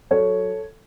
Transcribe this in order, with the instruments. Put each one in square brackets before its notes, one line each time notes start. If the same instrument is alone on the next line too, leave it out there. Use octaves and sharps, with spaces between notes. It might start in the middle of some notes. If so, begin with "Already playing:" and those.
[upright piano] F#3 A4 C#5